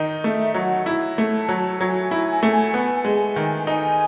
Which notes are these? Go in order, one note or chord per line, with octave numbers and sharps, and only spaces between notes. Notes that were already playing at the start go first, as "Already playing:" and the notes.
Already playing: D#3 D#4
A3 E5
F#3 F#5
E4
A3
A5
F#3
F#3 G#5
E4
A3
B3
G#3
D#3
D#4 G#5